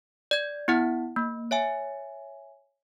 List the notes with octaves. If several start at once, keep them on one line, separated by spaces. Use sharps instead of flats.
D5 G#6
B3 E4 F#5
A#3
C#5 E5 G#5